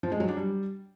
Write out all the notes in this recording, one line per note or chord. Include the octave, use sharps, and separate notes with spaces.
F3
G#3
F#3
D4
G3